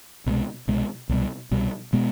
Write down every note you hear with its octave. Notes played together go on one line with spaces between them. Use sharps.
C2 B2 G#3
C2 B2 G#3
C2 B2 G3
C2 B2 G3
B2 G#3 B3